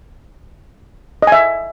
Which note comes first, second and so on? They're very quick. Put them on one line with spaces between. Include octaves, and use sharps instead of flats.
D#5 G#5 E5